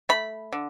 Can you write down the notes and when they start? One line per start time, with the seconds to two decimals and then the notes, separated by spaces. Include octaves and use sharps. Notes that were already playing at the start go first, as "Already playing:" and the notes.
0.09 A3 B5
0.52 D3